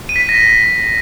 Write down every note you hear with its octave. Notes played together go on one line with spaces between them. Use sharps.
D#7
B6
D#7
A#6